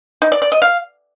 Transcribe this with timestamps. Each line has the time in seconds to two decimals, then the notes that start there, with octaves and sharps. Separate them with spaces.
0.22 D#4
0.32 D5
0.42 D5
0.52 D#5
0.62 F5